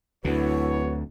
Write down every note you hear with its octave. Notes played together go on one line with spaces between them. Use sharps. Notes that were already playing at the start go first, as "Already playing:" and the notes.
D1 D2 D3 E4 F#4 B4 C#5